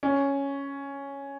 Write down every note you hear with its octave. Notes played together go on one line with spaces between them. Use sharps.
C#4